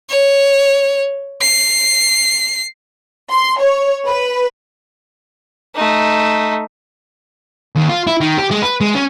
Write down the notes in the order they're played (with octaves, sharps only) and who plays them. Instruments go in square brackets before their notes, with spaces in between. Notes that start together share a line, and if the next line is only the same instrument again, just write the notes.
[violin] C#5
C7
[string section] C6
C#5
B4
[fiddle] A3 D#4
[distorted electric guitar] D#2
F4
E4
D#3
G4
G#3
B4
G#3
C#4